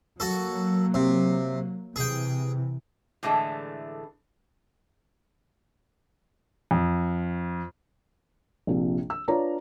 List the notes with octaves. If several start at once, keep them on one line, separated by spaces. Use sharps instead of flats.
F#3 A#3 F#4 A4
C3
C3 E3 G#4 G5
A2 D3 E3 G#3 A3 D4
F2
A#1 C3 F3
E6
D4 F4 B4 C#5 D5 A#5